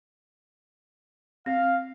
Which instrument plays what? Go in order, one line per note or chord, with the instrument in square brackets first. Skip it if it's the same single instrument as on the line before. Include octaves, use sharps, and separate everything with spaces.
[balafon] C4 [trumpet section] F5